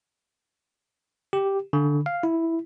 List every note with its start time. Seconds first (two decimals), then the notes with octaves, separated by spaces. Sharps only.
1.33 G4
1.73 D3
2.06 F5
2.23 E4